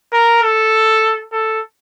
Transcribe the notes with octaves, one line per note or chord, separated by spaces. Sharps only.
A#4
A4
A4